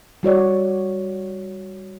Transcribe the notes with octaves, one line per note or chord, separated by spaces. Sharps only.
G3 F#4 C#5 D5